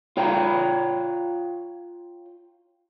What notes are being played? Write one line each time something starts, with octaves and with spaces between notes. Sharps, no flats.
F4 C#5 G5 A#5